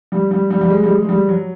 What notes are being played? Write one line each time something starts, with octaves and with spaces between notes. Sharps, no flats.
G3
G3
G3
G3
G#3
G3
G#3
G#3
G3
F#3